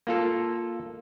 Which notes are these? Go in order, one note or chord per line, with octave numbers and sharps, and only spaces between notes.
A#3 F4 A4